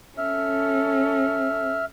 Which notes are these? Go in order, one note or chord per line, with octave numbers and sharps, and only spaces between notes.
C#4 A4 E5 F6